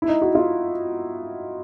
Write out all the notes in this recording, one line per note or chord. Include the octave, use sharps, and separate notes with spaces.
E4
D#4
F#4
F4